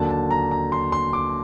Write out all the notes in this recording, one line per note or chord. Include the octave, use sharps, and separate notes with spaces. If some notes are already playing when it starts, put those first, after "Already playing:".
Already playing: D#2 D3 F#3 A5
A5
A#5
A#5
C6
C6
D6